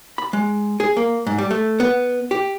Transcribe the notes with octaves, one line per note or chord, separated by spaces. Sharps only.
B5
G#3
G#4
A#3
G#2
G3
A3
B3
G4